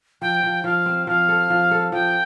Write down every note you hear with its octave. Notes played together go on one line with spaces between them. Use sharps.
F3 G5
F3
F3 F5
C4
F3 F5
A4
F3
A4
F3 G5